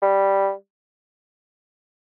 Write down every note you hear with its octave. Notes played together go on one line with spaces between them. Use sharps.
G3